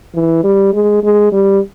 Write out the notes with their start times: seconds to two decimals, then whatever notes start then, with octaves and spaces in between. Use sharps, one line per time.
0.15 E3
0.44 G3
0.74 G#3
1.03 G#3
1.33 G3